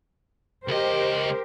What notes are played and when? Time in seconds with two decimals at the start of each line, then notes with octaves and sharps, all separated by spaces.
0.68 C#2 G4 A#4 C5 D#5